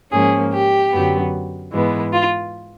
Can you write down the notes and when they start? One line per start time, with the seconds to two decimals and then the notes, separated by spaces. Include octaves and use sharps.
0.12 G#2 F3 A#3 C#4 G#4
0.53 G4
0.92 F#2 D3 F#3 B3
1.72 G#2 E3 G#3 B3
2.12 F4